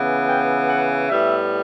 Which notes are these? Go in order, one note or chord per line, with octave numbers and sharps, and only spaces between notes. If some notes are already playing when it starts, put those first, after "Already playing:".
Already playing: C#3 E3 B3
G5
F#5
A2 G3 B3 E5